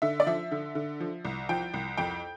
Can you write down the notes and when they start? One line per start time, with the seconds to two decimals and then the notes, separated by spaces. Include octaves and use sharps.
0.02 D3 E5
0.20 D5
0.26 F3 E5
0.51 D3
0.75 D3
1.00 F3
1.25 C2
1.49 F3 G5
1.74 C2
1.97 F2 G5